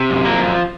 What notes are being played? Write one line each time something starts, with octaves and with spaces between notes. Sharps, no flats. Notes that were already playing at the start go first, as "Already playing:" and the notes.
Already playing: C3
F#2
F3 A#3
F#2